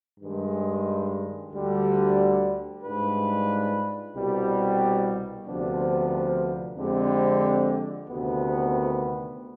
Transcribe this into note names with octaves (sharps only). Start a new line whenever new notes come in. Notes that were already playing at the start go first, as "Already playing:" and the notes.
G2 D#3 G#3
D2 D3 G3
G#2 G3 D4 F4 B4
C2 B2 G3
D2 C3 F3 B3 D4
F2 D3 G#3 C4 G4
D2 C3 D#3 B3